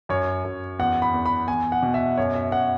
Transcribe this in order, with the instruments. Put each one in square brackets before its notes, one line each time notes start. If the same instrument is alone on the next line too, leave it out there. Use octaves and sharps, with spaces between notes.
[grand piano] F#2 C#5
F#2
E2 F#5
B5
E2
B5
E2 G#5
F#5
B2
E5
F#2 C#5
E5
F#2 F#5